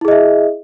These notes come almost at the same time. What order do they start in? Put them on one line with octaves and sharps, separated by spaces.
E4 G#4 D#5 E5